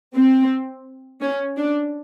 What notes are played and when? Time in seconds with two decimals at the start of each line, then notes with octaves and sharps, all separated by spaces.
0.14 C4
1.22 C#4
1.57 D4